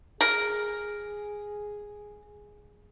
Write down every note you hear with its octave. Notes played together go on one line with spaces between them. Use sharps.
G#4 A#4